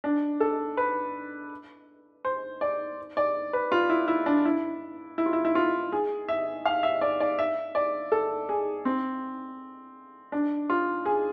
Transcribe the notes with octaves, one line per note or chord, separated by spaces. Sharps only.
D4
A4
B4
C5
D5
D5
B4
F4
E4
E4
D4
E4
E4
F4
E4
E4
F4
G#4
E5
F5
E5
D5
D5
E5
D5
A4
G#4
C4
D4
F4
G#4